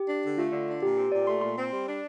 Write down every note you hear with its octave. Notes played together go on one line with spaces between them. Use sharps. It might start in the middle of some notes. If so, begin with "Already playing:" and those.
Already playing: G4
D4
D3
A3 F4
D3
D4
A#2 G4
C4 G4
A#2 D5
A3 C6
A#2 C6
C4
G3
D4